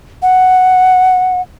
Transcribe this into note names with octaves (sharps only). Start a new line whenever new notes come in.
F#5